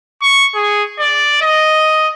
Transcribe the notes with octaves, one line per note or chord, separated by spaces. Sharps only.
C#6
G#4
D5
D#5